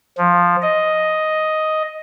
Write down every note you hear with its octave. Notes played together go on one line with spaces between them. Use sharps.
F3
D#5